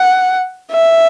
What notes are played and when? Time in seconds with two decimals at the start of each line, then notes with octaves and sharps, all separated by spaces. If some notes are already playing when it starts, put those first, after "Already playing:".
Already playing: F#5
0.72 E5